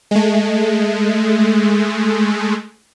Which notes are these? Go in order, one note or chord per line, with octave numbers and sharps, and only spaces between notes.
G#3 A3